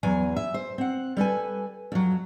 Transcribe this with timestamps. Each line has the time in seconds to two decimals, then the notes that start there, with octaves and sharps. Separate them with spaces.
0.03 E2 F#3 G#5
0.36 E5
0.54 C5
0.78 C4 F#5
1.17 G3 A4 B4 G#5
1.92 F2 F#3